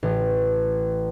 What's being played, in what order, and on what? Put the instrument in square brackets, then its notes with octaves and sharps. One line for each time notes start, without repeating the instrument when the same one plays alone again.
[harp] A1